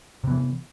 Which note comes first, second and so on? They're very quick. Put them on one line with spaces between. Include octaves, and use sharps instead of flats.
C3 B3 E3